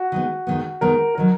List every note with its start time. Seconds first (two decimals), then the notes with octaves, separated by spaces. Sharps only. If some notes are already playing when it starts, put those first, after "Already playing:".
Already playing: F#4
0.12 D#3 G#3 B3
0.47 D#3 G#3 B3
0.81 D#3 G#3 B3 A#4
1.15 D#3 F#3 A#4